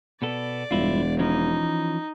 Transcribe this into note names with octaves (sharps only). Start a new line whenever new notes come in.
B2 B3 A4 D5
E1 G2 E4 F4
E3 F3 C#4 D#4